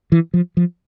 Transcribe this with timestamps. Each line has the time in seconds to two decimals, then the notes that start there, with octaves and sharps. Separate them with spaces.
0.12 E3
0.34 F3
0.57 F3